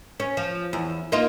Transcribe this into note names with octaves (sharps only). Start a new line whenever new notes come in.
C#4
F3
E2
A#3 D#4 F4